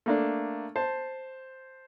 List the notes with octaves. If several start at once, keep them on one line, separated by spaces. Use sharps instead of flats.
A3 A#3 D4
C5 A5